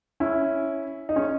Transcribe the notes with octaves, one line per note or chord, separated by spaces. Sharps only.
C#4 E4
D#4
C#4